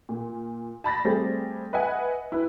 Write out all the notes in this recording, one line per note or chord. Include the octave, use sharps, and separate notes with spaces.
A#2
A5 B5 A6 A#6
G3 A3 C4 G4 G#4
B4 D#5 E5 F#5 G#5
E4 B4